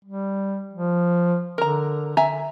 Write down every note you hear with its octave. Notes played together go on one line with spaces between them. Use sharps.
G3
F3
D3 A#4 A#5
D3 E5 G#5 A#5